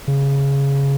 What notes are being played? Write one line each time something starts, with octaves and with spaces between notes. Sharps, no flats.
C#3